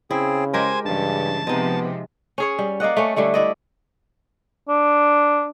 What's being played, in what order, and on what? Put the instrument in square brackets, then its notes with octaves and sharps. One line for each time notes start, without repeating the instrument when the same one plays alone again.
[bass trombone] C#3 [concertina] C4 G#4 [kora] E4
[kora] G#3 G4 A#4 [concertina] C5 G#5
[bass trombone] G2 [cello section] C#3 E3 [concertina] A5
[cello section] C3 F3 [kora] G#3 D#4 [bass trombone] B3
[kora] C#4 G#4 C#5
G3
A#3 D5 D#5 F#5
A3 C#4
D3 G3 A3 E4
E4 D5 D#5
[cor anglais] D4